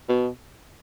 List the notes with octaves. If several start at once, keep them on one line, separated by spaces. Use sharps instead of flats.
B2